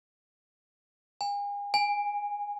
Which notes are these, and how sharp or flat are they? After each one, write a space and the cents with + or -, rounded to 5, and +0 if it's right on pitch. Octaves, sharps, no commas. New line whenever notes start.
G#5 -40
G#5 -15